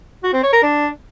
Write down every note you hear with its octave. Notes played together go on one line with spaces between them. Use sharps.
F#4
C4
C#5
A#4
D4